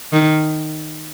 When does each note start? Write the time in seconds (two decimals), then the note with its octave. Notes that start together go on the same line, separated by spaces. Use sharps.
0.13 D#3